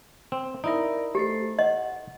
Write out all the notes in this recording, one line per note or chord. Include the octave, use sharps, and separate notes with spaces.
C4
D#4 E4 A#4 D5
A3 G4 A4 C5
D#5 F#5